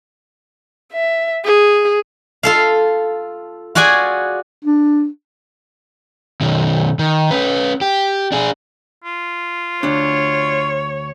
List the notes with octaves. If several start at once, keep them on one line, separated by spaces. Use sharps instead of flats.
E5
G#4
F4 A4 F5
F4 F#4 G#4 D5 G#5
D4
B2 D#3
D#3
C#4 B4
G4
D4 G#4
F4
D2 D4 C#5